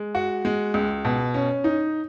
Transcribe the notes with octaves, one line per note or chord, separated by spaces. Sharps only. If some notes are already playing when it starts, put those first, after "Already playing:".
Already playing: G#3
F#4
G#3
C#2
B2
C#4
D#4